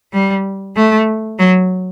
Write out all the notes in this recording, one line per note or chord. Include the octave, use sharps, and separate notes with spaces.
G3
A3
F#3